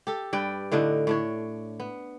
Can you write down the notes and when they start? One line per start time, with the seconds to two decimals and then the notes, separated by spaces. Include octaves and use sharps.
0.07 G4 A4
0.33 G2 B4 D5 G5
0.72 A2 D3 D4 D#4
1.07 A2 D4 C#5
1.80 B3